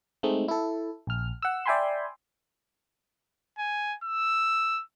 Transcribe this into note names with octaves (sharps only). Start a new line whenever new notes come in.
G#3 A3 C4 D#4
E4 A4
A#1 F6
F#5 E6
D5 E5 G5 G#5 B5 C6
G#5
E6